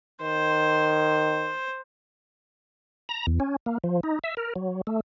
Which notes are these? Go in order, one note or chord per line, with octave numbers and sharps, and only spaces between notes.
D#3 C5
A#5
E2
C#4
A#3
F3
D#4
E5
A#4
F#3
A3